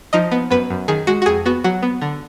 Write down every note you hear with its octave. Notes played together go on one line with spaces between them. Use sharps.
F3 D#4 D#5
B3
F#2 B3 B4
F#2
D#3 G#4
G#3 F#4
F#4
F2 G#4
B3 F#4
F#3 F#4
B3
D3